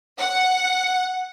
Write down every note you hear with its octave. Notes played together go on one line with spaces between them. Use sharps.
F#5